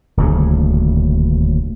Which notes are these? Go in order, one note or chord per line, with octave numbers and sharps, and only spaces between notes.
D#1 D2 C#3